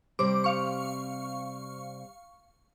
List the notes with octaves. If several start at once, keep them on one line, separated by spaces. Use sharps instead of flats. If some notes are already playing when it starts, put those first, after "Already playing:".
C3 G3 C5 D6
F5 C#6